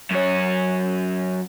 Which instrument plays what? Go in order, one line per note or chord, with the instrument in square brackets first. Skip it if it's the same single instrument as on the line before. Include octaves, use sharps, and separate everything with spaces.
[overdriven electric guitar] F#2 C#5